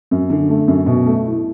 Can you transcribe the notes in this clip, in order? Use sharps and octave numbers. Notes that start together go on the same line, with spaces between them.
F#2
D3
A3
F#2
B2
A3
E4